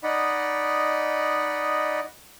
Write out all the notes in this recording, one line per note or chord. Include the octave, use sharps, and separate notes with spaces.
D#4 D5 D#5 F#5 B5